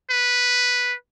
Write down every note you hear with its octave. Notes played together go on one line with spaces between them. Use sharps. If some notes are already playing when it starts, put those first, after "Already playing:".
B4